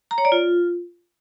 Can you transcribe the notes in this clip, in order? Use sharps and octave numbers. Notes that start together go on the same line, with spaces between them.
A#5
C#5
D5
F4